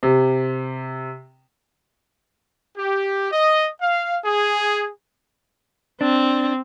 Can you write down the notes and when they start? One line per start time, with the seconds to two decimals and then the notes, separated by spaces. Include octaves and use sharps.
0.03 C3
2.78 G4
3.32 D#5
3.81 F5
4.25 G#4
6.01 C4 D4